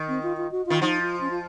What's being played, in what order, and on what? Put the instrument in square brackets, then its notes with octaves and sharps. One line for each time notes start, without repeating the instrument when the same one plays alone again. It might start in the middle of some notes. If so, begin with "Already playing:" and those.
Already playing: [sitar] D#3
[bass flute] C4
F4
F4
F#4
[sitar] D#3 [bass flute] F4
[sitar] F3 [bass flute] D#4
[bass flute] F4
C#4
F4